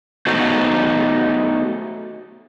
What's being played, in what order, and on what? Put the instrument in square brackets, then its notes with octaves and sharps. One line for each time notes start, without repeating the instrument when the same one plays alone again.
[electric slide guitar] A3 B3 D#4 F#4 C5